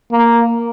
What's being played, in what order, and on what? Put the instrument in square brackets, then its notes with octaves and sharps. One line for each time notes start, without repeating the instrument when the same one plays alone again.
[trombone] A#3